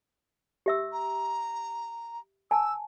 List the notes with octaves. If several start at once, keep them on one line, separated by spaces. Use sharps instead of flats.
G4 E5 E6
A#5
G#5 A5 E6